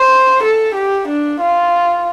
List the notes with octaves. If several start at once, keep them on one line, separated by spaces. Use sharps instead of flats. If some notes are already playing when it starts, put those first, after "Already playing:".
Already playing: C5
A4
G4
D4
F4